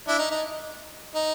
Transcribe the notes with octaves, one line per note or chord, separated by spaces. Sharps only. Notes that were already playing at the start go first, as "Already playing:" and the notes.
D4 E4
D#4
D#4
D#4